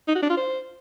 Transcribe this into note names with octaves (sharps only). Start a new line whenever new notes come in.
D#4
F#4
D4
F4
C5